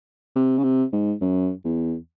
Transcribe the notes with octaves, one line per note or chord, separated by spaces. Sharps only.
C3
C#3
C3
G#2
F#2
E2